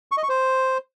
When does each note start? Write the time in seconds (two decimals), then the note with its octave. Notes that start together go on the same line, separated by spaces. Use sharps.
0.12 C#6
0.17 D#5
0.23 C#6
0.29 C5